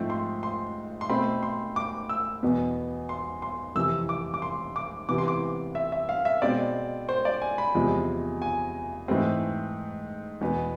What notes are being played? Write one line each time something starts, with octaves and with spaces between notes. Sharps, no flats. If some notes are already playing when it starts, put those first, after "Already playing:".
Already playing: G#2 F3 A3 C4
C6
C6
C6
B2 A3 C4 B5
C6
D6
E6
E2 B2 B3
C6
C6
F2 C3 E3 E6
D6
D6
C6
D6
C3 E3 B3 D6
C6
D6
E5
E5
F5
E5
B2 G#3 C4 D5
C5
D5
G#5
B5
E2 C3 F3 G#3
G#5
G#2 E3 A3 C4
E2 B2 B3